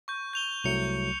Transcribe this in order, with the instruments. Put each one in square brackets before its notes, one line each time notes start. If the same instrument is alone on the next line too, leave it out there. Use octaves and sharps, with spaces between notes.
[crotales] C#6 G6
G6 F7 G7
[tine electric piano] C2 F#3 A3 [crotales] C#7 F7